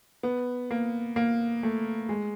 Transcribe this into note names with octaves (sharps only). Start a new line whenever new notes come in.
B3
A#3
A#3
A3
G#3